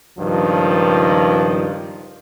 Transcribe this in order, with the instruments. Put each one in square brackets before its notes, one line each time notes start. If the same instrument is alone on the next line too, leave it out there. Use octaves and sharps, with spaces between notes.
[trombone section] C#2 G2 D#3 F3